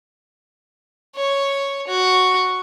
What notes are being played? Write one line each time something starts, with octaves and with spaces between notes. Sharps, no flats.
C#5
F#4